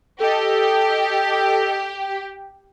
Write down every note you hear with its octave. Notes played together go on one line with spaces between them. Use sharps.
G4 A4 D#5